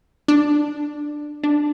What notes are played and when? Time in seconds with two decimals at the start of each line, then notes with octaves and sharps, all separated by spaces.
0.28 D4
1.43 D4